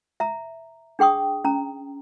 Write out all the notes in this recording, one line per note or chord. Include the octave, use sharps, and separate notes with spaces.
E5 A#5
D4 G#4 G5 C#6 D#6
C#4 A#5